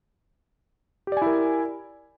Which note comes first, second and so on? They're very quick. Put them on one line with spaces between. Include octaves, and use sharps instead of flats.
G4 D5 G#5 E4 A#4